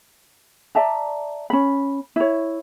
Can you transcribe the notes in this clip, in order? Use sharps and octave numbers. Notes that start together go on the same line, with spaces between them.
D5 E5 A5 A#5
C#4 B5
E4 C#5